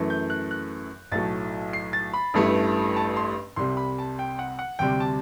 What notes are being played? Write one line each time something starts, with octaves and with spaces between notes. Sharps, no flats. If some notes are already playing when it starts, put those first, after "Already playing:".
Already playing: F#2 E3 A3
G6
F#6
F#6
B1 A2 F#3 A3 A6
C7
A6
B5
A1 G2 E3 A3
A5
C6
C2 C3 G3 C6
B5
A5
G5
F#5
F#5
D2 C3 G3 G5
A5